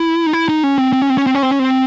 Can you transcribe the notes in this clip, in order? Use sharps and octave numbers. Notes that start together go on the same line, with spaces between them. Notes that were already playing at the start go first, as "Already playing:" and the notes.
Already playing: E4
D#4
E4
D#4
C#4
C4
C4
C#4
C4
C#4
C4
C#4
C4
C#4
C4